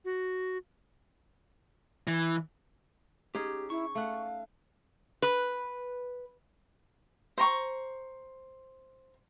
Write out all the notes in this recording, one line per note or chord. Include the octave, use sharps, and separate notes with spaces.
F#4
E3
C#4 D#4 G4 G#4
E4 C#6
A3 F5 F#5
B4
C5 A#5 C#6